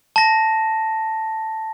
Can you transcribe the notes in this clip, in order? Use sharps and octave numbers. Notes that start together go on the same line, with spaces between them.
A5 A#6